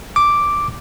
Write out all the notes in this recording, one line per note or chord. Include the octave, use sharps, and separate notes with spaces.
D6